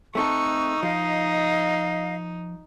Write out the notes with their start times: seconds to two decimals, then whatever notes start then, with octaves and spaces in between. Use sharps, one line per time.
0.15 A3 C4 D#4 A4 C#6 E6 F#6
0.83 F3 D#5 F5